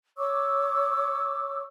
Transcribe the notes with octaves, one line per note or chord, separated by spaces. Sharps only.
C#5 C#6 D6 E6